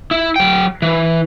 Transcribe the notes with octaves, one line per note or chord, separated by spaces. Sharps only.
E4
F#3 G5
E3